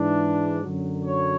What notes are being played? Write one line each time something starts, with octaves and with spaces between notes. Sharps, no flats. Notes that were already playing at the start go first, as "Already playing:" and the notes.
Already playing: G#2 E3 D4
F#2 D3 F#3
C#5